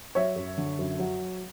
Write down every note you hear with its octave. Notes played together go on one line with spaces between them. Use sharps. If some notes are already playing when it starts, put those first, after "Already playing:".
F#3 C#5 E5
F#2
D3
F#2
F#3